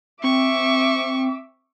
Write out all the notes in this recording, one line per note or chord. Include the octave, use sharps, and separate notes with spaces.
C4 E5 C#6 D6